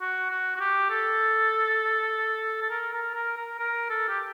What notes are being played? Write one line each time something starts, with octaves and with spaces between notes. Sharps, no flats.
F#4
F#4
F#4
G4
A4
A4
A#4
A#4
A#4
A#4
A#4
A4
G4